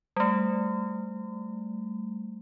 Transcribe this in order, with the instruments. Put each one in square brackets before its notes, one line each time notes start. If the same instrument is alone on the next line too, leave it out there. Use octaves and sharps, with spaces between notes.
[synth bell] G3 A3